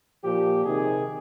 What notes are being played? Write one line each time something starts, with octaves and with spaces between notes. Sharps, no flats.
A#2 F3 G4
C3 D#3 G#4